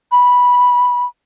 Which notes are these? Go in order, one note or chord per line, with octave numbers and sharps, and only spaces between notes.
B5